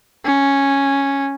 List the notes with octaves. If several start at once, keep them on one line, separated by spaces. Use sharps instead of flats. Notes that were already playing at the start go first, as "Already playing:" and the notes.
C#4